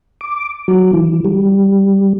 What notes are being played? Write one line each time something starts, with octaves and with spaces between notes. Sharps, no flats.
D6
F#3
E3
G3